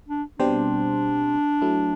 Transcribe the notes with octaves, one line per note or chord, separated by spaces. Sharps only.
D4
B2 G3 C4 D4 G4 C5
F#3 A3 E4